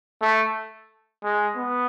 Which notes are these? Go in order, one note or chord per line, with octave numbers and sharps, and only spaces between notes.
A3
G#3
B3